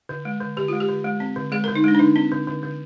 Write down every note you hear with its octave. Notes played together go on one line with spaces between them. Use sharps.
D3
G#3
D3
D3 G4
G#3 F4
G4
D3
G#3
C4
D3
G#3 G#4
A#4
D3
D#4
G#3 D4
D4
D3 D#4
C4
D3
D3
D3